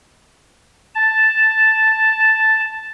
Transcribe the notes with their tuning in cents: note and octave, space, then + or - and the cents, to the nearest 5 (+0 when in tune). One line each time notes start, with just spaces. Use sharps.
A5 +0